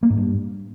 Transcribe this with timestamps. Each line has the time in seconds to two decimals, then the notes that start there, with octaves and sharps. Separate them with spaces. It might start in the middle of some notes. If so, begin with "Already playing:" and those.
0.03 A#3
0.10 G#2
0.18 G2